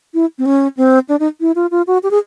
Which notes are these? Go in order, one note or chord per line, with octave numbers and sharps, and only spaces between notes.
E4
C4
C#4
C4
D4
D#4
E4
F4
F4
F#4
G4
G#4